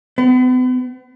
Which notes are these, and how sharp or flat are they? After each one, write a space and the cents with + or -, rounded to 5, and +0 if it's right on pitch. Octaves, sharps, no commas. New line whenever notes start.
B3 +40